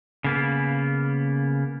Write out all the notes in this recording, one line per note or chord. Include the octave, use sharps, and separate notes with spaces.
C#3 A#3 B3